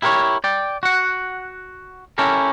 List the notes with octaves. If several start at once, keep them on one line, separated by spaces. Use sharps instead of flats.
E4 G4 A#4 C5 C#5
D5 G5
F#4 F#5
C#4 E4 G4 A4 A#4